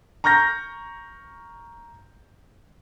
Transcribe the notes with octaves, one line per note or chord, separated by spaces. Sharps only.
A#5 C#6 F6 G6 A#6